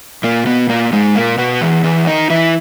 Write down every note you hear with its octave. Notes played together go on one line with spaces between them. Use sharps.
A#2 A#3
B2 B3
A#2 A#3
G#2 G#3
A#2 A#3
B2 B3
E2 E3
E2 E3
D#3 D#4
E3 E4